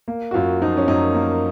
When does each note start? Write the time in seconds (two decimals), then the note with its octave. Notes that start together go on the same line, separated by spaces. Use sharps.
0.08 A#3
0.31 F#4
0.34 F#2 F4
0.61 F3 D#4
0.77 C#4
0.88 F#2 D#4
1.15 A#3